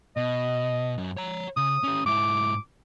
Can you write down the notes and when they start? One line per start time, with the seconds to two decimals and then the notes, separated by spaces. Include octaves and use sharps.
0.17 B2 D#5
0.98 F#2
1.17 C#5 A#5
1.57 C#3 D#6
1.83 C#4 G4
2.06 G#2 E4 D6